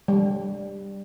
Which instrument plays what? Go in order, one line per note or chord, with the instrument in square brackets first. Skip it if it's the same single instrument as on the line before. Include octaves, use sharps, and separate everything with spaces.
[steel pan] G3